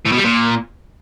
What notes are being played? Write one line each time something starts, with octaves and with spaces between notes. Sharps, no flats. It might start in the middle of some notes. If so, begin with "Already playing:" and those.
A2
B2
G3
A#2